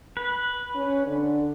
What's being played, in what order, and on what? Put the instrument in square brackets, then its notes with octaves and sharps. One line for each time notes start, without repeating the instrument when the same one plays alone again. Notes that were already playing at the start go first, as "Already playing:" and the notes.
[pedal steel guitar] B4
[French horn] C#4
D3